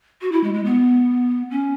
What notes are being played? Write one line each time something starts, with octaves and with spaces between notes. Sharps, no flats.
F#4
E4
G#3
G#3
B3
C#4